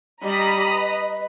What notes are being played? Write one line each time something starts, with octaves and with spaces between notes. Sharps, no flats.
G3 D#5 A#5 B5 D#6
B4